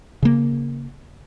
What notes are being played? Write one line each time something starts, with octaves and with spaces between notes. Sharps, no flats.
C#3 A#3